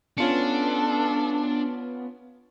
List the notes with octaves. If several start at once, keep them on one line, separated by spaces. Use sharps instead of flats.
B3 C#4 D4 F4 A4 C#7